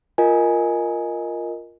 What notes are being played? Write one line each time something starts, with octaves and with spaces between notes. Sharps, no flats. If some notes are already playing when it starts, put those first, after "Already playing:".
F4 A#4 D#5 G#5